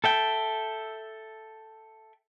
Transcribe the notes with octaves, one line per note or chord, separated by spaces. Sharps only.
A4 E5 G5